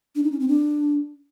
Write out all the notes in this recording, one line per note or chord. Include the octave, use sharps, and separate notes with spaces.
D4
D#4
C#4
C4
D4